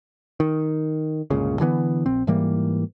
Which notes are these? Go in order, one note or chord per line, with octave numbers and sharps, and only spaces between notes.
D#3
G1 C#2 A#2 C#3
D3 E3 G3 B3
A#1 C4
G#2 E3 G3 A#3